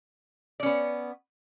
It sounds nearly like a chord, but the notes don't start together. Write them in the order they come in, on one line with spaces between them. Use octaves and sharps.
D5 C#4 B3